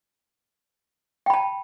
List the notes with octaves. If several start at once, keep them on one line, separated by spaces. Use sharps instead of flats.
G5 A5 B5